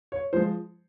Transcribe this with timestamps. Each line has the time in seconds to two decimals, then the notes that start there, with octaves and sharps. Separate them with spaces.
0.12 C#5
0.33 F3 G#3 C5